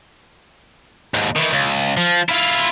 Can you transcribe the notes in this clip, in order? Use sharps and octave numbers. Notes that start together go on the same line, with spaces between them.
D#2 G#2
D#3 E3
C#2
F3
E4 F4